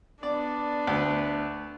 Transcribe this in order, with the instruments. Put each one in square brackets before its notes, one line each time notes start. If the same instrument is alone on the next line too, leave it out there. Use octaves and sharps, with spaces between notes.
[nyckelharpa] B3 D4 [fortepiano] D5
[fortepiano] D2